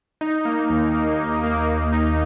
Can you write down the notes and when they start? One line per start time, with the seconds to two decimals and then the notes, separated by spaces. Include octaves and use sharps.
0.21 D#4
0.45 A#3
0.70 D#2
0.94 A#3
1.19 D#4
1.44 A#3
1.68 A#3
1.92 D#4